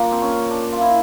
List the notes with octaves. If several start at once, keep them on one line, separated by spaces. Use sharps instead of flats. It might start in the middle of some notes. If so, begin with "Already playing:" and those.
Already playing: A#3 D4 F4
C4
C#4
D4
F4
E4